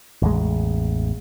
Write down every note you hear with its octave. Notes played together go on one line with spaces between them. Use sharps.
A1 E2 G#3